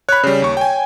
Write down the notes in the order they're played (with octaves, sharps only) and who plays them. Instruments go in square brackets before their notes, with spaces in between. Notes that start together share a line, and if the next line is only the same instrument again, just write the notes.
[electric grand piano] C#5 B5 [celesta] F#6
[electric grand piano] C#3 G3 [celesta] C#5
[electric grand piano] D#2 C#6
G5 G#5